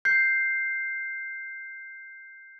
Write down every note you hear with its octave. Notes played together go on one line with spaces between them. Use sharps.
G6 C7